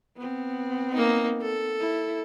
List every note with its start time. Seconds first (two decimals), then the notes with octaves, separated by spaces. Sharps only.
0.16 B3 C4
0.93 A#3 D#4
1.42 A4
1.80 E4